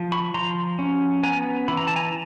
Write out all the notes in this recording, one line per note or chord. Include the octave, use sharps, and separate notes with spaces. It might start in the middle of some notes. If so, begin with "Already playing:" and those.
Already playing: F3
B5 C#6
F3 A#5 C6
C#4
B3 G#5 A#5
E3 B5
A#5
A5
G#5 A#5